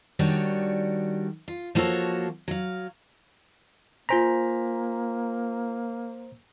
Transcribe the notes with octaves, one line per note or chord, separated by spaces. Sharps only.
D#3 G3 D4 F#4 C#5
F4
F3 A#3 F#4 A4 C#5
F#3 F5
A#3 F4 C5 G#5 A#5 B6